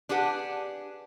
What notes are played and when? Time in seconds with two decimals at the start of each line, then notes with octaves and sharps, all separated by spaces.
0.09 D4 G4 G#4 B4 F#5